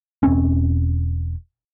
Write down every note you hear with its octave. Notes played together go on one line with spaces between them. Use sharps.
E1 C4 C#4